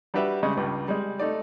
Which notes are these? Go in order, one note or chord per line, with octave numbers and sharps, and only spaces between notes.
G3 D4 F#4 G4 B4 E5
C#3 G3 G#3
C#2 G2
G3 G#3
A3 D#4 D5